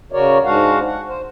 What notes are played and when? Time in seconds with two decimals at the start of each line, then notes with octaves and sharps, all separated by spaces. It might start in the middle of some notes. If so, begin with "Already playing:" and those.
0.12 C#3 F#4 A#4 C#5 D5
0.45 G#2 G#3 D4 F#4 F5 F#5
0.85 F#5
1.08 C5